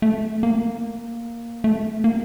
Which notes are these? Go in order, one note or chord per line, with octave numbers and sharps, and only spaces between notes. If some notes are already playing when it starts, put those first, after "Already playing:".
A3
A#3
A3
A#3